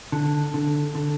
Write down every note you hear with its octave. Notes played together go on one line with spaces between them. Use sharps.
D3
D3
D3